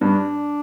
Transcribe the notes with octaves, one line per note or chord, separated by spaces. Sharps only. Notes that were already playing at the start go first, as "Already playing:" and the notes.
G2 D4